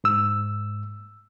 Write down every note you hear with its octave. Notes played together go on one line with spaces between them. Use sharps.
G#2 E6